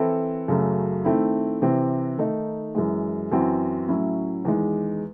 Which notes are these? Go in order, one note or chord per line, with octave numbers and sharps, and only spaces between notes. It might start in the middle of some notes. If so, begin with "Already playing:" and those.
Already playing: E3 C4 E4 A4
F#2 C#3 F#3 A3
D#3 A3 C4 E4
C3 E3 C4
D#3 A3 D#4
F#2 E3 G#3
F#2 E3 C4 F#4
A2 F#3 C#4 E4
E2 D#3 G#3